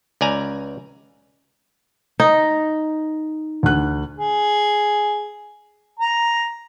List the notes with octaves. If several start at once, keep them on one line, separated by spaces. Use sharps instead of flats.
C#2 D5 G#5 A#5
D#4
D2 F#6
G#4
A#5